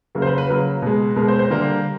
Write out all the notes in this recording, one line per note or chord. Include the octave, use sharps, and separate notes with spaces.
C#3 F#3 A#3 A#4
C5
B4
B4
C#3 F#3 A#3 A#4
B2 G#3
B2 G#3 A#4
C5
C5
D3 G3 A#3